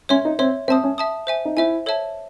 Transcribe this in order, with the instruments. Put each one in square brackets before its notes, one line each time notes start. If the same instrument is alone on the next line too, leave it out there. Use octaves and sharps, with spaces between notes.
[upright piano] C#4 [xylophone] C#5 E5 C6
[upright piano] D#4
[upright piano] C4 [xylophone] C#5 E5 C6
[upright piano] C4 [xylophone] E5 A5 D#6
[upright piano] C#4
[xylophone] E5 A5 D#6
C5 E5 G#5
[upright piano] D#4
[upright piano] E4 [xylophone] C5 E5 G#5
[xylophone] A4 C#5 E5 A5